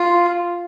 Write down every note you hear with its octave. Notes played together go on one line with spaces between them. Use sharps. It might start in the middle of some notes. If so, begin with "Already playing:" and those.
Already playing: F4